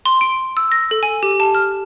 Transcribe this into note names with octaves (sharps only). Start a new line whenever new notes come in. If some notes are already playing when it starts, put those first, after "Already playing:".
C6
D7
E6
A#6
A4
G#5
G4
A5
F6